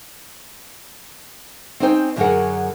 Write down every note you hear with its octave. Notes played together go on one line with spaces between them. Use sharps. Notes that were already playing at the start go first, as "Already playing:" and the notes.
C4 C#4 D#4 C5 F#5 G5
F#2 D3 F#3 G#4 A#4 F#5